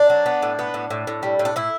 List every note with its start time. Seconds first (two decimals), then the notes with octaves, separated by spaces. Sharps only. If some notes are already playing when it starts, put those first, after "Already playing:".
Already playing: D4
0.10 F#3
0.26 B3
0.42 A2
0.59 B3
0.74 A2
0.90 A2
1.07 A2
1.23 G3
1.39 A2
1.45 D4
1.56 A2 E4